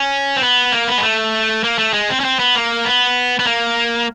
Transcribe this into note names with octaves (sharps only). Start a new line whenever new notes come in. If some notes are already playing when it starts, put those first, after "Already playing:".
Already playing: C#4
C4
B3
A#3
B3
G#3
A3
A#3
A3
G#3
C4
C#4
C4
B3
A#3
B3
B3
A#3